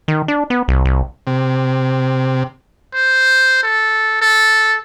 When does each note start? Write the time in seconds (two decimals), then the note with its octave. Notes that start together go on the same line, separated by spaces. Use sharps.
0.08 D#3
0.28 D4
0.50 B3
0.68 C2
0.85 C2
1.27 C3
2.94 C5
3.63 A4
4.21 A4